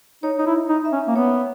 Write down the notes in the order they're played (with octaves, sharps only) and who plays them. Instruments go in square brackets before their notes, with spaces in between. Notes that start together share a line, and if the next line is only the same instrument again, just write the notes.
[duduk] D#4 [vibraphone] C#5
[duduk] D#4
E4
D#4
[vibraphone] E5
[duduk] C#4
A#3
[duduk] B3 [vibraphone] C#5